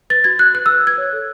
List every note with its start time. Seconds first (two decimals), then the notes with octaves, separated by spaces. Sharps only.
0.10 B4 A6
0.24 F#4 G#6
0.39 F#4 F#6
0.54 B4 F#6
0.66 B4 E6
0.84 B4 G#6
0.98 C#5
1.13 A4